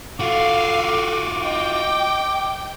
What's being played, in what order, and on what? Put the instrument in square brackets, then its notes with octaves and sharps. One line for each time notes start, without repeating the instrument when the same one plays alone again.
[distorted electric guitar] F4 F#4 [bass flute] A4 [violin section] F5 [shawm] D6
[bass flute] D#5 [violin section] G5